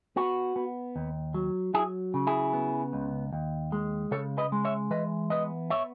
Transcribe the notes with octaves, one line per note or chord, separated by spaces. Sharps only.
B3 F#4
B3
D#2
F#3
F#3 E4 G#4
C#3
E4 G#4
B3
C#2
D#2
G#3
C#3 A4 C#5
B4 D#5
G#3
C#5 E5
E3 B4 D#5
B3 B4 D#5
C#5 E5